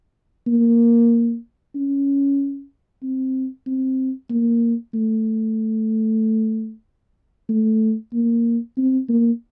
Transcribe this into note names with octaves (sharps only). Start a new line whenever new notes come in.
A#3
C#4
C4
C4
A#3
A3
A3
A#3
C4
A#3